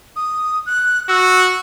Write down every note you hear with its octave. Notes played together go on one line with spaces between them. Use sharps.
D#6
F#6
F#4 E6